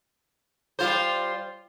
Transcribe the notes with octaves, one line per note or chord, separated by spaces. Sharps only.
G3 F4 C5